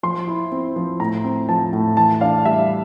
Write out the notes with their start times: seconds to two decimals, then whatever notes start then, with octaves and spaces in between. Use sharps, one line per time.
0.03 F3 C6
0.27 E4
0.52 C4
0.76 F3
1.00 A2 A#5
1.24 C4
1.49 F3 A5
1.73 A2
1.97 E3 A5
2.21 D4 F5
2.45 G3 E5